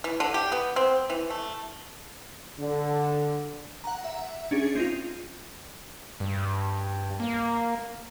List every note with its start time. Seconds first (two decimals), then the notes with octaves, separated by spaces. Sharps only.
0.04 E3
0.20 D3
0.34 G4
0.52 B3
0.76 C4
1.10 E3
1.30 A3
2.59 D3
3.84 F#5 A#5
4.04 E5
4.51 C#4 D4 G#4
4.75 C4 D#4 F4
6.20 G2
7.20 A#3